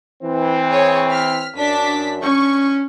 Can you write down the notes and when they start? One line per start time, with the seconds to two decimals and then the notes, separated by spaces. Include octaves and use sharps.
0.23 E3 C4
0.70 G#4 C#5
1.11 F6 B6
1.56 F#2 D4 B6
2.22 C#4 C#6